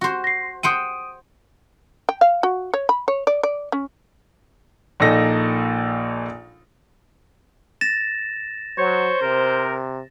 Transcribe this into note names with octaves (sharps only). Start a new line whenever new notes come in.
F#4 C5
A#6 C7
C5 F#5 G5 D#6 D7 D#7
G5
F5
F#4
C#5
B5
C#5
D5
D5
C#4
A#1 A#2 D#4 A4 A#6
A6 A#6 E7
F#3 C5 C#5
C3 A#4